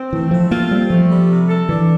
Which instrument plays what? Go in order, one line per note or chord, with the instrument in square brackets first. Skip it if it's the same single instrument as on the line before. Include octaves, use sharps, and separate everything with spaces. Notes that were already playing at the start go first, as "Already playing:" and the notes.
Already playing: [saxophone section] C4
[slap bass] E3 [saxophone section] A3
[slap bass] F3 [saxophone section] A3
[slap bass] A#3 [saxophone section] F4
[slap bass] G3 [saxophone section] C4
[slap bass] F3 [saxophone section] A3
[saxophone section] G3
C3
A4
[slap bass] E3 [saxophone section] D4